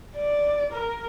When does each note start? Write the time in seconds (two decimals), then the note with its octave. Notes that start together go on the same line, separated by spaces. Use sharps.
0.16 D5
0.72 A#4